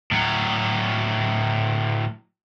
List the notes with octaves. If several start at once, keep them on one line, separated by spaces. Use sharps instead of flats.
A2 F#3